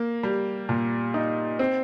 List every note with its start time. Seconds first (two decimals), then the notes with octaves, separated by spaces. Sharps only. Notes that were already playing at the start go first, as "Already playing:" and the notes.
Already playing: A#3
0.23 G3
0.69 A#2
1.14 D#4
1.59 C4